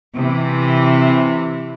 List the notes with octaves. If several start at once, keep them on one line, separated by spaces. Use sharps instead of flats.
C3 E3